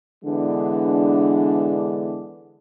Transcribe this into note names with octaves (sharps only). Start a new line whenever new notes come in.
D3 E3 G#3 B3 D4